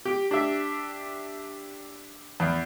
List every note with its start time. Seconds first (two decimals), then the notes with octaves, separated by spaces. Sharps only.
0.05 G4
0.31 D4 G4 E5
2.40 E2